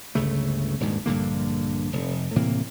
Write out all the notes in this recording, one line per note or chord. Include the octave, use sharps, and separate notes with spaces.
G1 C#2 C#3 A3
D#1 D2 G#2
A#1 G2 D3 A#3
F1
A2 C3 E3 A#3